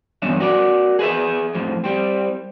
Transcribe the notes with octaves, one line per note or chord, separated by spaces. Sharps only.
E2 G2 C#4 E5
F#4 A#4 D5
G#4 B4 D#5 E5
F2 A2 F3
G3 C4